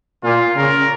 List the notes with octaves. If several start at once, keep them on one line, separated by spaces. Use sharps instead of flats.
A#2 F4
C#3 A#4